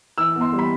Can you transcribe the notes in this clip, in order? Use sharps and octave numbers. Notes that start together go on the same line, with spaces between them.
E3 E6
B3
C6
G3
B5